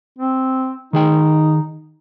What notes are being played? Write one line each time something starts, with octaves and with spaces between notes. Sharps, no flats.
C4
D#3 D#4 G#4 G5